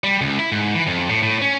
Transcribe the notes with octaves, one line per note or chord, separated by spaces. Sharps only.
G3
C#2
E4
G#2
E3
F2
A2
A2
C#4